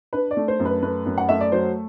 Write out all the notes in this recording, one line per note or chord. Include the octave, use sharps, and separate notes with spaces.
D4 B4
D5
A3
C5
F#2
B4
A3 B4
F#2
F#5
A3 E5
D5
F#3 C5